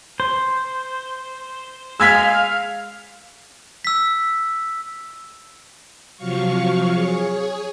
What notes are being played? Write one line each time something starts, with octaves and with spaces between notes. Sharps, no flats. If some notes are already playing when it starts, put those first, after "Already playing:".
C5
G#3 F5 E6 G#6 B6
E6 B6
C3 F3 F#3 F5 C#6
G#4 C#5